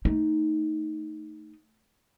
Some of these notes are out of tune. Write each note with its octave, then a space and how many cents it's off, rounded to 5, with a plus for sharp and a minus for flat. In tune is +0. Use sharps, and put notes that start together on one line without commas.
A3 +10 D#4 +0